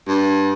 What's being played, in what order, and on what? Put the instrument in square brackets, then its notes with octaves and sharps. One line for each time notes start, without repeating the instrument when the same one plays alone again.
[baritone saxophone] G2